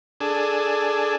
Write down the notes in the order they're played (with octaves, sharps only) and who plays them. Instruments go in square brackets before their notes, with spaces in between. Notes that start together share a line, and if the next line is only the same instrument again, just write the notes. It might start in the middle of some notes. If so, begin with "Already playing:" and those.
[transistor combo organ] D4 G#4 A4